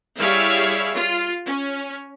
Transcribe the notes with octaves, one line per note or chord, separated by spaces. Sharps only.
G3 E4 G#4 C#5 E5 F5
F4
C#4